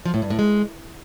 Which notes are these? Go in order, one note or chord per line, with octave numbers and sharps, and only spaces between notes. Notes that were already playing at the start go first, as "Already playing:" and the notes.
F3
A2
G2
A2
G#3